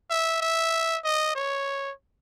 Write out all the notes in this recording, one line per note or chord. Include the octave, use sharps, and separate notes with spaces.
E5
E5
D#5
C#5